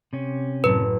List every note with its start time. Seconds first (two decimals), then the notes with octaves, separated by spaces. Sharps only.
0.13 C3 C#4
0.64 F#1 A2 B4